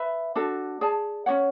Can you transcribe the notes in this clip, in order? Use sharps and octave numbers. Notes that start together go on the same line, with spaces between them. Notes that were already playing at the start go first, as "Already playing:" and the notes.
Already playing: B4 E5 B5
D4 F#4 A4
G#4 D5 A5
C#4 F#4 C#5 F#5